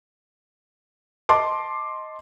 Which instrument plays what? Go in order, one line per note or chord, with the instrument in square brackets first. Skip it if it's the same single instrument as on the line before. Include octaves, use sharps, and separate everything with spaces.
[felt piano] D#5 A5 C6 D6